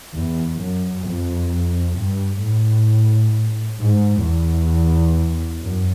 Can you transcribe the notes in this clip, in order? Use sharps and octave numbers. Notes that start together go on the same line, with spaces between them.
E2
F#2
F2
G2
A2
G#2
E2
F#2